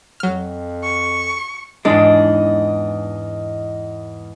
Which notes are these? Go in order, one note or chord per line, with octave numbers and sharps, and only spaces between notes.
F2 F#3 F6
C#6
E2 G#2 G#3 D4 D#5